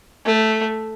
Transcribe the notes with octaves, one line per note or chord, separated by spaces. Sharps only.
A3